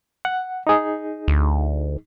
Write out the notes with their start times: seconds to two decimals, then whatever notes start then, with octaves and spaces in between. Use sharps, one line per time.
0.25 F#5
0.67 D#4 G#4
1.28 D2